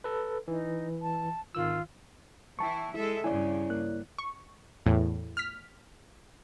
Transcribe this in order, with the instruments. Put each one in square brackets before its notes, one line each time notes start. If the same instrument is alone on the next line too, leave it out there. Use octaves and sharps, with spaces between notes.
[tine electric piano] A4 B4
[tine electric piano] E3 [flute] D#4
[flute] A5
[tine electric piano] G#1 D#3 E6 [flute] F4
[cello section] E3 E4 [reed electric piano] G5 A5 C#6
[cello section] G#3 A4 E5 [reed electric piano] E4
[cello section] G2 C#3 [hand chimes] E4 C#5 D5 [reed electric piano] G#5
[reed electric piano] A#3 F#6
[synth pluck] C#6
E2 A2
F6 B6